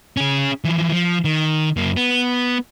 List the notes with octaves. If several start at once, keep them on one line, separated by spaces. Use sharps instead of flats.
C#4 G#4
E3 F3
F3
D#3
F#2 A#3
B3